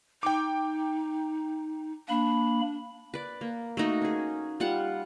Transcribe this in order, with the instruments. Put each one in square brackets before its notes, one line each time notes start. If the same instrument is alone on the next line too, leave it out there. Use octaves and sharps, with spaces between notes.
[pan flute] D#4 [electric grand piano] G5 D6
[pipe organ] A#3 B5 [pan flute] D4
[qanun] B4 D5
A#3
A3 A#3 D#4 F#4
C#4 G#4
G3 F4 F#5